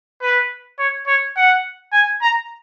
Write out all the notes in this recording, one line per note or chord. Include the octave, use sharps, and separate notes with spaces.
B4
C#5
C#5
F#5
G#5
A#5